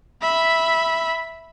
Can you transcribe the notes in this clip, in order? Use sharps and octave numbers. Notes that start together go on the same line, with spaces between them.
E5 B5